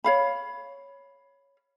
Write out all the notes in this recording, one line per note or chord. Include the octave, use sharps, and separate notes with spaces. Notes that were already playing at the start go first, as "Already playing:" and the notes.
C#5 F5 B5